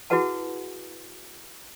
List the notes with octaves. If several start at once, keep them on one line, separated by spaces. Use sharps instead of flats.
E4 F#4 G#4 B4 F#5 A5